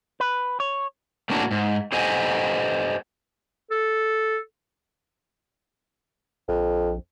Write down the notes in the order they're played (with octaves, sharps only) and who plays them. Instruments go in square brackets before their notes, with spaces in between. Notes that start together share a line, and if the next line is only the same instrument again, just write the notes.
[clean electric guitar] B4
C#5
[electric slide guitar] A2 A#3 C#4 D4 F#4 A4
G#2
G4 A4 C5 D#5 F#5 G#5
[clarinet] A4
[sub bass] A#1 [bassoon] F2